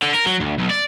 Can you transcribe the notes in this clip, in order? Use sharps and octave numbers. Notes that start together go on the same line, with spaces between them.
D3
A#4
F#3
D2
B1
D5